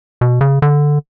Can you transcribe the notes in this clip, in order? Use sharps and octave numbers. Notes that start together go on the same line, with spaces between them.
B2
C#3
D3